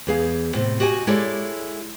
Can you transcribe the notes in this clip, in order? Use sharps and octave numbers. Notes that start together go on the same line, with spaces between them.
E2 G#4 F5
A2 C3
F#4 G4 D#5 F#5 G#5
G#3 E4 G4 A4 C#5 D5